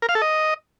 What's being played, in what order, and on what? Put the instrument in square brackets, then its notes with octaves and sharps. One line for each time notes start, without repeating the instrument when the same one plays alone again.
[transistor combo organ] A#4
F5
A4
D#5